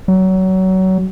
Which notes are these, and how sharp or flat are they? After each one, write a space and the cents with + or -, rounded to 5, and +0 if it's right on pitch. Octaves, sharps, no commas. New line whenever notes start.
F#3 +25